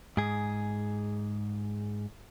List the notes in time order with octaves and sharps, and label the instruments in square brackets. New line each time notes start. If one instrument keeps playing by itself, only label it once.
[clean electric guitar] G#2 G#4